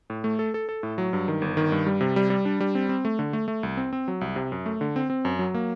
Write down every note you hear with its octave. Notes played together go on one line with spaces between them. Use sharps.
A2
A3
A4
A4
A4
A2
F#3
G2
D#3
G1
D#3
G2
G3
C3
G3
G3
D4
G3
C4
C4
A3
D3
A3
A3
C2
C4
C4
F#3
C2
C3
F#2
A3
D3
C4
C4
F#2
F#3
A#3